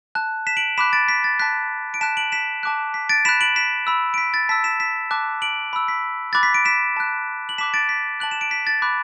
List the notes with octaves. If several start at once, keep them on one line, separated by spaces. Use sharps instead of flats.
A5 F#6
B6 E7
D7 F#7
B5 D6 F#6 B6 E7
A6 D7
B6
A6
A5 F#6 B6
D7
A5 F#6 B6 E7
D7 F#7
B6 E7
A5 D6 F#6
B6
A6 D7
B5 F#6 B6 E7
D7 F#7
B6 E7
B5 E6
D7
B6
A6
A5 E6 B6
B6 E7
B6 E7
A5 D6 F#6
D7 F#7
B5 E6
B6
B5 D6 F#6 A6
B6
D7
B6 E7
A5 F#6
F#7
A5 D6 F#6 B6 E7
A6 D7
B6
A5 F#6 F#7
E7
D7
B6
A6
B5 D6 F#6